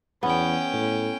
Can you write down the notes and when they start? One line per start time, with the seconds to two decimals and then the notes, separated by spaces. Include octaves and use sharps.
0.23 E2 B3 C#4 G5
0.73 A2